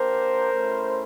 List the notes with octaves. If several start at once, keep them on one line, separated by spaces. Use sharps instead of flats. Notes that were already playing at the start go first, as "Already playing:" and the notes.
Already playing: A#3 D4 G4 A#4 C5
A3 C#4 E4